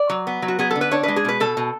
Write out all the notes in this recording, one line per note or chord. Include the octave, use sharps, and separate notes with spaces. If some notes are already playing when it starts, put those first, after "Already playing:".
Already playing: D5
F#3
B3
F#3
F#4
B3 G#4
A4
D3
B4
D4 C#5
G#3 B4
G#4
B2 B4
B2 A4
B2